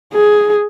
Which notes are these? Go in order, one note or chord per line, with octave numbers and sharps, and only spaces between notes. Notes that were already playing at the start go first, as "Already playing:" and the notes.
G#4